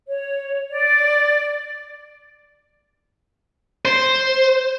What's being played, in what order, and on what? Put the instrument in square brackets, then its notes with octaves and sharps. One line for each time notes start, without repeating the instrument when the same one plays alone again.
[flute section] C#5
D5
[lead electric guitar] C5